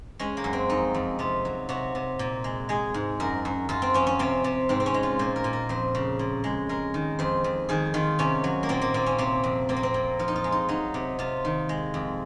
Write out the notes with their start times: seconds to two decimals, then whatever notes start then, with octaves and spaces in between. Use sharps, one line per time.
0.19 G#3 C#4
0.37 A#3
0.44 F#2
0.53 C4
0.69 F2 D#4
0.94 F2
1.19 C3 F4
1.45 F#3
1.69 C3 F#4
1.95 C3
2.19 A#2
2.44 G#3
2.69 G#3 G#4
2.94 G#2
3.20 F#2 A#4
3.45 F#2
3.69 F#2 F4
3.82 C4
3.94 F3 C#4
4.07 C#4
4.19 C3 C4
4.44 C3
4.69 G#2 C4
4.80 C4
4.86 C#4
4.94 G#3
5.03 F4
5.19 A#2 C5
5.36 A#4
5.44 A#2
5.53 A#4
5.69 F2 C5
5.95 C#3
6.19 A#2
6.44 G#3
6.69 G#3 A#4
6.94 D#3
7.19 F2 C5
7.44 F2
7.69 D#3 G#4
7.94 D#3 F4
8.19 C3 C#4
8.44 F#3
8.63 A#3
8.69 A#2 C4
8.82 A#3
8.94 A#2 C4
9.06 C#4
9.18 C3 C4
9.44 F2
9.69 A#2 C4
9.77 A#3
9.83 C4
9.94 A#2
10.19 F3 F4
10.28 D#4
10.36 F4
10.44 G#3
10.52 D#4
10.69 F#3 D#4
10.94 C3
11.19 C3 F4
11.45 D#3
11.69 G#3
11.94 F2